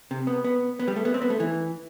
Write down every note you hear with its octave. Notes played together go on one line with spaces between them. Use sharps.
C3
B3
B3
B3
G3
A3
B3
C4
B3
A3
E3